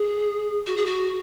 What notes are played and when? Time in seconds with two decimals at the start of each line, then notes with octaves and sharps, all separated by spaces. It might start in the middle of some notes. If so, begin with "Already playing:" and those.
Already playing: G#4
0.66 F#4
0.76 G#4
0.85 F#4